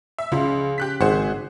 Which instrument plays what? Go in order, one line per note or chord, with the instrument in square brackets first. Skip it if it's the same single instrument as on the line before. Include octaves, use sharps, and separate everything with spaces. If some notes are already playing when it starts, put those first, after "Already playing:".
[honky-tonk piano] E5
[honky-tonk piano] C#2 [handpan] C#3 F4
[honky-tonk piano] G4 F#6 B6
[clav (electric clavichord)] G#1 [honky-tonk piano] G#4 C5 F#5